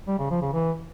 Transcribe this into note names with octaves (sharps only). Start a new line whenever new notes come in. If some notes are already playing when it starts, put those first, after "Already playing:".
G3
C#3
F3
C#3
E3